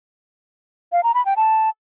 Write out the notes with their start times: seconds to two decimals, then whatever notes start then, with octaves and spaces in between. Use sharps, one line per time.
0.92 F5
1.03 A#5
1.14 B5
1.25 G5
1.37 A5